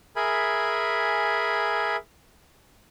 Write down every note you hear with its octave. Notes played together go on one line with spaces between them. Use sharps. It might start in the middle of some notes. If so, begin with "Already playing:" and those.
G#4 A#4 E5 G#5 B5